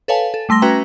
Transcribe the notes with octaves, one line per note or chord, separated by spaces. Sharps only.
A4 B4 C#5 F5 G#5 A5
A4
G3 A3 C6 A#6 G7
C#4 F#4 B4 E5 G5 A#5